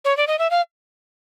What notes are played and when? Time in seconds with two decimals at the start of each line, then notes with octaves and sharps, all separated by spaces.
0.05 C#5
0.17 D5
0.27 D#5
0.39 E5
0.51 F5